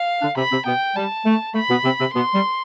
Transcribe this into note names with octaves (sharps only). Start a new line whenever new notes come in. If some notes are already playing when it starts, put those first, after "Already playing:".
Already playing: F5
D3 D4
C3 C4 B5
C3 C4
B2 B3 G5
G3 A5
A3
A3 B5
B2 B3
C3 C4
C3 C4
B2 B3 C6
G3